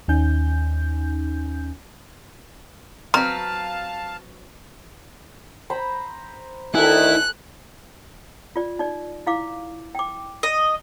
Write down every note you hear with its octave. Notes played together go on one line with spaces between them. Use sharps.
D#2 C#4 D#4 G#5 G6
F#3 C4 B4 F5 A5 A#5 F6
C5 A#5 B5
D2 D#3 E4 A4 D#5 G#5 F#6
F4 D5
D#4 D5
E4 F5 D6
G5 D6
D#5